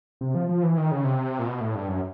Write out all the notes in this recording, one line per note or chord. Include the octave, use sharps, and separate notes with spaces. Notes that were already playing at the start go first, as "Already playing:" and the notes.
C3
F3
F3
E3
D#3
C#3
C3
A#2
B2
A2
G2
F#2